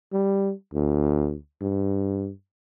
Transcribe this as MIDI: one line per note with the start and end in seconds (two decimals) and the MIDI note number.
0.13 0.52 55
0.74 1.35 38
1.61 2.30 43